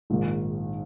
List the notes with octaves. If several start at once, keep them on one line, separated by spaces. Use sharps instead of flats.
A#1 G#2 D#3